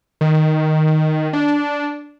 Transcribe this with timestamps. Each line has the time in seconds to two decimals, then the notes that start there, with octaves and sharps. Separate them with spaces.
0.21 D#3
1.33 D4